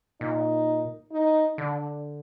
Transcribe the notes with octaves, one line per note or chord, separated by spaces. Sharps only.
A#2 D#4
D#4
D3 D4